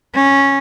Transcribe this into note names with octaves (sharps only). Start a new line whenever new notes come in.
C#4